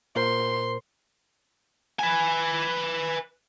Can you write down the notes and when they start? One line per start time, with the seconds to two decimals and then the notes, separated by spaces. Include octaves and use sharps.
0.16 A#2 A#4 C5 C6
1.99 B4 G#5